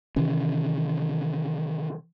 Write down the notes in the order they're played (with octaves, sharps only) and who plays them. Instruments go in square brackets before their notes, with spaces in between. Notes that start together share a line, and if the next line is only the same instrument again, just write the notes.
[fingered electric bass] C3 D#3 E3 C#4